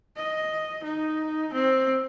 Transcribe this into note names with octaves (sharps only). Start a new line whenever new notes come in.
D#5
D#4
C4